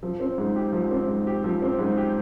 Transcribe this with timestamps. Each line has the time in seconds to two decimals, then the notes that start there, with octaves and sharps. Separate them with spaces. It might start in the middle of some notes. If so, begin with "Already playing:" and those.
0.03 F3
0.20 C4
0.38 G#2
0.56 G4
0.72 F3
0.91 C4
1.08 G#2
1.27 G4
1.44 F3
1.62 C4
1.79 G#2
1.98 G4